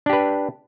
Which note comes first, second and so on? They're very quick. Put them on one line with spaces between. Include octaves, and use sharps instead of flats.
D4 G4 B4